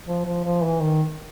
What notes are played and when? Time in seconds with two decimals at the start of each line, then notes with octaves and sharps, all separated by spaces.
0.07 F3
0.26 F3
0.45 F3
0.64 E3
0.82 D#3